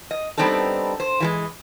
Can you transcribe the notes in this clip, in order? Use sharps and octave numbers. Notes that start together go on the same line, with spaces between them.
D#5
G3 B3 C4 D4 D#4 A4
C5
E3 G3 G#3